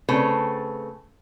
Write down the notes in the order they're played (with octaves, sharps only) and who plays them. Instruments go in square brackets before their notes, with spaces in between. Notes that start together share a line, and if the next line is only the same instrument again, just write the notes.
[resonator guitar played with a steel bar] C#3 A3 C4 B4